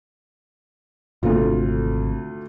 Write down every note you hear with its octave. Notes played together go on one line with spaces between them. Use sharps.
G#1 D2 C3 A3 F4